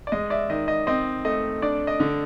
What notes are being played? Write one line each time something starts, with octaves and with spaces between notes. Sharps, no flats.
D5
G#3 D#5
D5 E5
D#3 D#5
D#5
C4 D#5
A3 D#5
D4 D5
D#5
D3